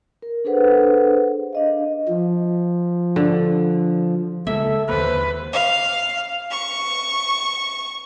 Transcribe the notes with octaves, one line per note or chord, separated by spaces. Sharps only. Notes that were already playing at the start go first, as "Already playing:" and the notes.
A#4
D4 G#4 A4 B4 C5 F#5
D4 D#5 F5
F3
D3
C#3 G#3 A#3 A4 E5
D#2 D3 A#3 B4 C5
F5
C#6